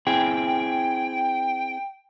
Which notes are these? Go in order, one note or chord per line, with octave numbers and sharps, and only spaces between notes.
C4 E4 G#4 G5